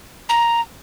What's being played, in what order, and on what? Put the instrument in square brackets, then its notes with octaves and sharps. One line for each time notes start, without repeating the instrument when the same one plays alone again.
[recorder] A#5